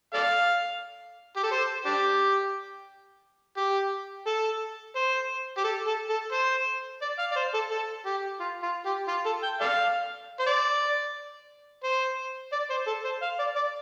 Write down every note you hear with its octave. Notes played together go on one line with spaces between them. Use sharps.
A4 D5 F5
G4
A4
C5
D4 G4
G4
A4
C5
G4
A4
A4
A4
C5
D5
F5
D5
C5
A4
A4
G4
F4
F4
G4
F4
A4
G5
A4 D5 F5
C5
D5
C5
D5
C5
A4
C5
F5
D5
D5